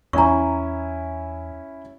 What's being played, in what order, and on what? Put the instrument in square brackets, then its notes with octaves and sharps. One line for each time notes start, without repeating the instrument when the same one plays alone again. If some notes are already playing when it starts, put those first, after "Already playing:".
[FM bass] E2 [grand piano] C#4 E4 G#5 [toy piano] A#5 C#6